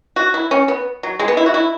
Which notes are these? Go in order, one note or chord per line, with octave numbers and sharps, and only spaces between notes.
F#4
E4
C#4
B3
F#3
G#3
B3
E4
F#4
E4